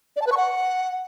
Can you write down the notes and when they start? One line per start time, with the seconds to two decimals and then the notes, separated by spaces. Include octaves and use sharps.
0.16 D5
0.22 A5
0.27 B4
0.32 C#6
0.37 F#5